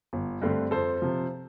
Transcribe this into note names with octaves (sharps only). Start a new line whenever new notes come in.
G1
G2 D3 A3 C4
F2 A4 C5
C3 F3